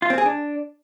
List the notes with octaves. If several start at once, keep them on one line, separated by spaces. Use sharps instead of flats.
F4
C4
G#4
D4